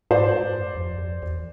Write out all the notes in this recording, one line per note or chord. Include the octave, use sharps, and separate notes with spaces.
G#2 C5 D5
G2
F#2
F2
F2
E2